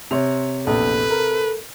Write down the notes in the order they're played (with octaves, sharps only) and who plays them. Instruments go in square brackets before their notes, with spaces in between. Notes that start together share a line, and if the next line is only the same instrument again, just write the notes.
[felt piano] C3 [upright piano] C#5 C6 F7
[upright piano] A#1 E2 [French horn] A4 [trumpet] B4
[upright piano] A#4